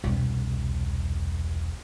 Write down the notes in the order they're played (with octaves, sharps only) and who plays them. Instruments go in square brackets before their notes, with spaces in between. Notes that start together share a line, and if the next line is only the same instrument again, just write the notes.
[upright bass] E1 C2